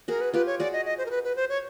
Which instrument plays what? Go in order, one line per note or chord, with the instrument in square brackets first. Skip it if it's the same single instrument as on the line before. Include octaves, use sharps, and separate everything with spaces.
[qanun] F#4 G#4 [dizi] A#4
[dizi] B4
[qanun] F4 G4 [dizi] B4
[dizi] C#5
[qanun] F#4 G#4 [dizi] D5
[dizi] D#5
D#5
C5
A#4
B4
B4
C5
C#5